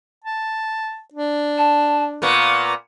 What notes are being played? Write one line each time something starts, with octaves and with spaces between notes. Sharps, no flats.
A5
D4
A5
A#2 A#3 B3 C#6